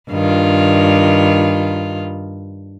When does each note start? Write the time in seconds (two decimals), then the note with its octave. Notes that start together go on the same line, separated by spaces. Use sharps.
0.10 G2 D#3 F4